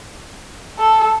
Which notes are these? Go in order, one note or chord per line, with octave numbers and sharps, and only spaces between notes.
A4